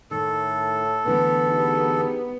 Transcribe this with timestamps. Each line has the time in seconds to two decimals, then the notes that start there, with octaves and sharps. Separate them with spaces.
0.11 A2 D#3 A4
1.06 D3 E3 A3 B3
1.48 D#4 G4 G#4